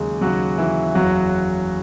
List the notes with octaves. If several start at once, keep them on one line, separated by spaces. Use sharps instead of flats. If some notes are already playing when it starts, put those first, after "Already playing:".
Already playing: D#2 C#3 F#3 G#3 G#4
D#2 C#3 F#3 F#4
E3 E4
F#1 E2 C#3 F#3 F#4